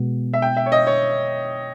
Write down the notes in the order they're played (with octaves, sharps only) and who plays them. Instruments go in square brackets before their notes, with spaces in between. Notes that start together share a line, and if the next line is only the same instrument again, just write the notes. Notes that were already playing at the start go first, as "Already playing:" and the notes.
Already playing: [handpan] B2 G#3 B3
[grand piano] E5
G5
E5
C#5
D#5
C#5